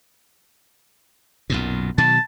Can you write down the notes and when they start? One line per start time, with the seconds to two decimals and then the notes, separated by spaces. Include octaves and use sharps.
1.50 B1 F#2 A#2
1.98 B2 D#3 F#3 A5